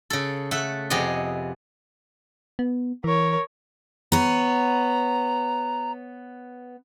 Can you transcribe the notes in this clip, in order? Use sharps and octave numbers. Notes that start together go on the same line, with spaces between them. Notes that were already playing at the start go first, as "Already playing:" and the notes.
C#3 A4
A3 A4 E5 F#5
F2 C3 B3 G#4 D#5
B3
E3 A#4 C#5
B3 C#5 A#5